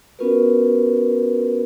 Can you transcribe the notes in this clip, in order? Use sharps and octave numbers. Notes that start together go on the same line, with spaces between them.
B3 C#4 F4 F#4 A#4 B4